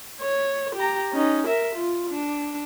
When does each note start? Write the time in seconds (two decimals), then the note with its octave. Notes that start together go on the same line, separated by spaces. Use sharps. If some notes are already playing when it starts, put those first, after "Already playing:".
0.22 C#5
0.75 G4 A#5
1.13 C#4 D#4
1.47 A#4 E5
1.76 F4
2.10 D4